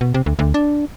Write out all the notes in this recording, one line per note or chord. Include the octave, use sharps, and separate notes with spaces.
B2
C3
D2
D2
D4